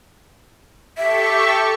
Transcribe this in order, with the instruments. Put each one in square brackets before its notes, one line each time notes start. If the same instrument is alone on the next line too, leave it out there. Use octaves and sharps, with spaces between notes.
[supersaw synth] G4 A4 C#6 [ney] E5